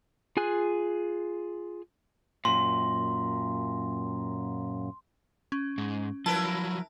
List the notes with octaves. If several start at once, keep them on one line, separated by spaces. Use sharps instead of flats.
F4 G#4 G#5 F#6
F#2 A#2 C6
C#4
G#2
F3 F#3 E4 A#4 B4 A5